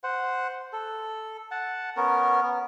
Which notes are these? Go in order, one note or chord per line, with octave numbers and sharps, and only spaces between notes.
C5 F#5
A4
F#5 A5
B3 C#4 A#4
B3